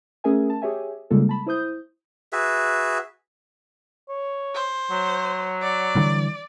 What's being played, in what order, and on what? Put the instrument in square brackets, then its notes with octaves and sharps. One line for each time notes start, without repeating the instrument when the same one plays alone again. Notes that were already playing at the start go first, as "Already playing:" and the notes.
[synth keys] A3 C#4 G#4 A#4 E5 G#5
A5
G4 G#4 C#5 E5 G#5
C#3 G3 G#3 A#3 F4 A4
A5 B5
E4 C5 D#6 G6
[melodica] F#4 G#4 B4 E5
[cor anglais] C#5
[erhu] C5
[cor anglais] F#3
[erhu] D5
[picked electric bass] D3 E3 G3